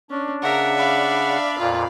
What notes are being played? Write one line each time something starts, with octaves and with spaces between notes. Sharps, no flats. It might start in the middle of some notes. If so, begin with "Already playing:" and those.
C#4 D4
C#3 A#4 E5 F#5
D5 F5 B5
F2 A#2 F4